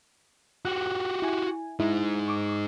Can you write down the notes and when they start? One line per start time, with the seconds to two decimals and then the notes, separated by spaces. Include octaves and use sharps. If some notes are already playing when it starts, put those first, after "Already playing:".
0.65 F#4 G4 F#6
1.22 E4 G#5
1.80 G#3 D#4 E4
2.28 C#6 D6